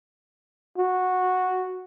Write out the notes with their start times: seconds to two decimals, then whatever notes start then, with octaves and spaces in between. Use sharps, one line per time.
0.78 F#4